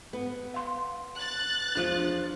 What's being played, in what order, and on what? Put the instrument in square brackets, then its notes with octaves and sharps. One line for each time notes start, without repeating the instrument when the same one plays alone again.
[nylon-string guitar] B3
[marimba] F5 C6
[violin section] F#6 A6
[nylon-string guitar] E2 F3 F4 [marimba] D4